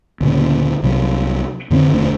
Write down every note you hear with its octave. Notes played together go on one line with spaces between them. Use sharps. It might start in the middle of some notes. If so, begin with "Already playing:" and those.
D2 A#2 C#3
C2 C3 F#3
F2 D3 A#3 C4
E1 D2 A3 D4